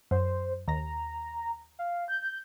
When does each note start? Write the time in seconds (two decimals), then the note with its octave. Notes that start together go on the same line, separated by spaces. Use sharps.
0.11 F#2 C5
0.68 D#2 A#5 A#6
1.79 F5
2.08 G6